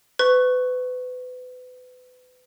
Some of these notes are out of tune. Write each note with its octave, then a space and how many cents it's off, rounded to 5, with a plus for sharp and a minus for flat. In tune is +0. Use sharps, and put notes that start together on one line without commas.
B4 +30 C#6 -5